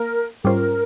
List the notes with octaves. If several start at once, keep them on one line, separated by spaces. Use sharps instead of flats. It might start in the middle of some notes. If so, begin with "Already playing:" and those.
Already playing: A#3 A#4 F5
G#2 G3 C#4 F4 A#4 C5